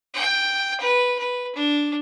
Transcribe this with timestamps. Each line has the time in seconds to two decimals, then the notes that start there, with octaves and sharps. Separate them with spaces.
0.14 G5
0.80 B4
1.19 B4
1.55 D4